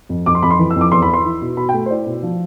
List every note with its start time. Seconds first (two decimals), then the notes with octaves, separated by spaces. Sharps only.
0.09 F2
0.26 F2 D6
0.35 C6
0.43 F2 B5
0.51 C6
0.59 E3
0.70 E6
0.76 F2
0.81 D6
0.92 E2 C6
1.02 B5
1.08 E4
1.14 C6
1.25 E4
1.41 B2
1.57 B2 B5
1.69 G5
1.74 A3
1.86 C5
1.90 E4 D5
2.06 B2
2.23 F3